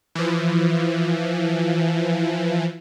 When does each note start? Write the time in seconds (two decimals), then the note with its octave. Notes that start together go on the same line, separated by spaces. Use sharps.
0.15 E3 F3